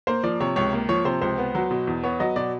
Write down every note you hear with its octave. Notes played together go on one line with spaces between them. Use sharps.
A#3 C5
F3 D5
C3 C#5
C#2 C#5
A#3
F3 C#5
C3 C5
C#2 C5
B3
F#3
B2
E2
B3 C#5
F#3 D#5
B2 D5